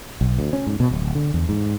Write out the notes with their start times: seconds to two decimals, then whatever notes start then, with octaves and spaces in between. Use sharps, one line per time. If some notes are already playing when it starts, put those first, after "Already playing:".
0.21 B1
0.39 D2
0.53 C#4
0.67 G#2
0.80 B2
0.91 D1
1.15 D3
1.34 E2
1.49 G#2